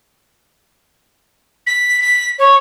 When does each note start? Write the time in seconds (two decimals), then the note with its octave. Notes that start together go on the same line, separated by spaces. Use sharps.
1.66 B6
2.01 B6
2.38 C#5